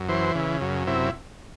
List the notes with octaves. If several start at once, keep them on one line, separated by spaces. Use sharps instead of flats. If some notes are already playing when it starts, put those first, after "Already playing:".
Already playing: F#2
E3 C5
C#3
F#2
C3 E4